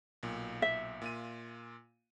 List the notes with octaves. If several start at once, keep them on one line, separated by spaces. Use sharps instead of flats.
B1 A#2
E5
A#2 F4 D#7